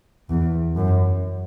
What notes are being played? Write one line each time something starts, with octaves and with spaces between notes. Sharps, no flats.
E2
F#2